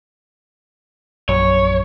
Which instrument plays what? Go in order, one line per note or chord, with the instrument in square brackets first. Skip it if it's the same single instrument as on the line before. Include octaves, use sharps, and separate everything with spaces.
[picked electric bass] A#1 F#2 [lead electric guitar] C#5